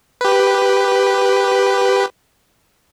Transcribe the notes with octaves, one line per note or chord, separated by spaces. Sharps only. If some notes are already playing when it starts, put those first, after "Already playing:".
G4 B4